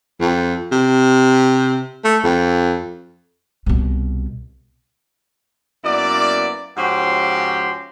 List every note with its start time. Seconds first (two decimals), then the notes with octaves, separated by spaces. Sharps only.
0.20 F2
0.72 C3
2.04 A3
2.24 F2
3.66 C2 B2
5.84 F#2 A#3 B3 E4 D5
6.77 G#2 F3 C#4 F#4 G4 C6